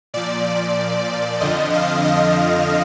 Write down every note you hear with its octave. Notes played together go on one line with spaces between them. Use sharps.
A#2 F3 D5
F2 D3 F3 D#5
F5
D#5